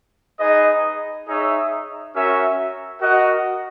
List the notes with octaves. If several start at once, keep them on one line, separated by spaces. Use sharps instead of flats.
D#4 G#4 B4 D#5
D#4 G#4 C#5 E5
C#4 F#4 A#4 E5
F#4 A#4 D#5 F#5